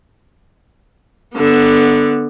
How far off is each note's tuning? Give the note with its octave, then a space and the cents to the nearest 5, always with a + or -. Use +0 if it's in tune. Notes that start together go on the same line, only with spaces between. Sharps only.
D3 +0 B3 -5